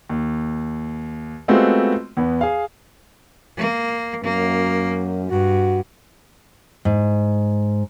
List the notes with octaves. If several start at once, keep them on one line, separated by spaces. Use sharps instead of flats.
D#2
G#3 A3 B3 C4 F4 F#4
E2 B3
G#4 F5
A#3
F#2 A#3
G2 F#4
G#2